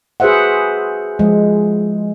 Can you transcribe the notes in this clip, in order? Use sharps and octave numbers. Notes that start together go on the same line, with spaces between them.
F#4 G#4 B4 C5 E5 F#5
F3 G#3